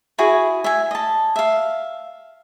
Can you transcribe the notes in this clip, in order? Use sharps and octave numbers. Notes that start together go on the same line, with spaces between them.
E4 F#4 G#4 G#5
E5 G#5
D#5 A5
E5 F5